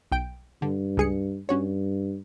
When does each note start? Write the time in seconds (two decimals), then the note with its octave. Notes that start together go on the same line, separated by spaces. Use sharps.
0.12 B1 G5 D7
0.62 G2 D3
0.97 C#2 G#4 C#7
1.49 G2 C#4 F#4 C#5